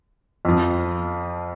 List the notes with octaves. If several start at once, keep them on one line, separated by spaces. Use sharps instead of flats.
F2 F3